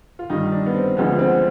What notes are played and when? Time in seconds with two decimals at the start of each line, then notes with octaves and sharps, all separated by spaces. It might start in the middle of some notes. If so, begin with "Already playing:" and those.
0.19 F4
0.30 G2 D#3 G3 D#4
0.52 D4
0.66 B3
0.75 C4
0.97 D2 D3 F3 G#3 B3
1.19 C4